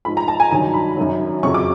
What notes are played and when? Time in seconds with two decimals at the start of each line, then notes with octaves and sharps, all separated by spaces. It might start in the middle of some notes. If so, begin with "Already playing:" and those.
0.05 G#2 F3 B5
0.17 A#5
0.28 A5
0.40 G#5
0.51 G2 D#3 F#3 A#5
0.74 B5
0.97 F#2 D#3 F#3
1.43 F2 C#3 F#3 C#6
1.54 D6